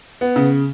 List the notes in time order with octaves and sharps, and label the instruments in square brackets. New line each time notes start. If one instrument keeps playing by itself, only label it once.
[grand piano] B3
C#3